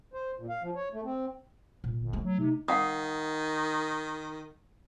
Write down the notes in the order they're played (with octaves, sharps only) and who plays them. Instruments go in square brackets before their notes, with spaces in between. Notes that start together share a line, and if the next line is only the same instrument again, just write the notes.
[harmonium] C5
A#2
F5
F3
C#5
A3
C4
[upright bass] A#2
[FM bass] G1
[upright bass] A3
[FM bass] F#3
[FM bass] C3 [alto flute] D#4
[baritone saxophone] D#3 [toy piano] F5 F#5 D#6